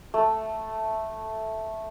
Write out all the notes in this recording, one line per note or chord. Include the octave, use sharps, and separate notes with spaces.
A3